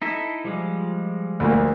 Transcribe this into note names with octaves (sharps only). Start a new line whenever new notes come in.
D#4 E4 A4
F3 G3 G#3
D2 A#3